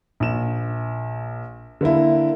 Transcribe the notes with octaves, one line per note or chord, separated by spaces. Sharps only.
A#1 E7
D3 A#3 E4